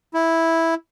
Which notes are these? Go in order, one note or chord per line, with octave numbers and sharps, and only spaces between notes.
E4